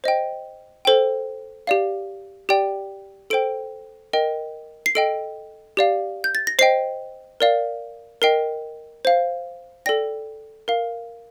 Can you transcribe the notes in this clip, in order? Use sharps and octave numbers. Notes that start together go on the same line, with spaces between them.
C5 D#5 G5
A4 C5 G5
G4 D5 F5
G4 D5 G5
A4 C5 G5 D7
A#4 D#5 G5
C7
A4 D#5 G5 D7
G4 D5 F5
G6
A6
A#6
C5 D#5 G5 C7
A#4 D5 F5
A#4 D#5 G5 C7
C5 F5
A4 D5 G5 A#6
A#4 F5